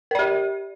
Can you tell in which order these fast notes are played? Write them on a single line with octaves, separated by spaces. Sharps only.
A#4 D5 G4